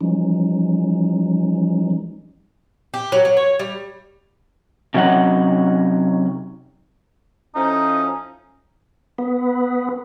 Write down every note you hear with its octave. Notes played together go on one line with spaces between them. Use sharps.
E3 F3 G3 G#3 C#4 D#4
G4
F#3
F#3
C#5
G3
C3 F#3 C#4 D#4 F#5
A2 F3 C#4 D#4
B3